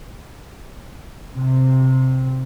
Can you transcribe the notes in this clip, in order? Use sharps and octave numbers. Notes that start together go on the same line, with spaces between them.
C3